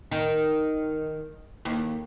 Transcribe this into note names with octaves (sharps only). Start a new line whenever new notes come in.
D#3
D#2